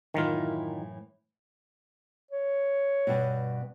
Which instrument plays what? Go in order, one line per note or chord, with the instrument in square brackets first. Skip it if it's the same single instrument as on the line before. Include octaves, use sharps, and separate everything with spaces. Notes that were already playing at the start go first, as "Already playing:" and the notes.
[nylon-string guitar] F#2 A2 E3 [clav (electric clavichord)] D#3 F4
[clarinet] C#5
[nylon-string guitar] G2 B2